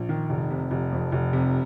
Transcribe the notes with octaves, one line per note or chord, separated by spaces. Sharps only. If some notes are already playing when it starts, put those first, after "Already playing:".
Already playing: A#1
D#3
F1
C3
F1
F2
F1
C3